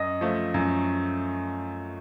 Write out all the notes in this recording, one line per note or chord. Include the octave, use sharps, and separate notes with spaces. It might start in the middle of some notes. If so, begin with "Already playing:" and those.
Already playing: F#2 D#5
F3 A3
F#2